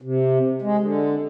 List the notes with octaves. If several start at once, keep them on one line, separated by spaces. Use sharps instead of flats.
C3
G#3
D3